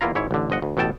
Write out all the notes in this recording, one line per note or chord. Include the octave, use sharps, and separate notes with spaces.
E2 A#3 E4 F4 A#5
G#1 G#2 E4 C#5
A1 D3
G1 F3 D#5 F#5
D2
A1 B2 A4 G5 A5